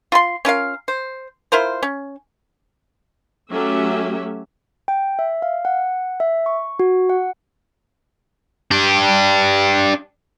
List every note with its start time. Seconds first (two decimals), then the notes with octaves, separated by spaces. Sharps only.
0.12 F4 B5 C6
0.45 C#4 F4 A#4 F5
0.88 C5
1.52 E4 F4 A#4 C5
1.83 C#4
3.52 F#3 A3 C#4 G4 E5
4.88 G5
5.19 E5
5.42 F5
5.65 F#5
6.20 E5
6.46 C#6
6.79 F#4
7.10 F#5
8.71 D4 G4